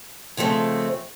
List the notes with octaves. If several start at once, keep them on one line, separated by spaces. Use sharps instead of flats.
C#3 F3 G#3 A3 C4